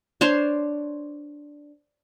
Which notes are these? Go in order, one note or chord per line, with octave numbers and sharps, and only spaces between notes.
D4 C5 C#5 C6